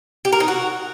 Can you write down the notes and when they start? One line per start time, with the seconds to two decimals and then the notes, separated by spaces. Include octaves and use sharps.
0.25 G4
0.33 A#4
0.40 D#4
0.48 F#4